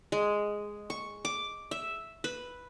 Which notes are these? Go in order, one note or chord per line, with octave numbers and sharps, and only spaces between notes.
G#3
C#6
D6
E5
B4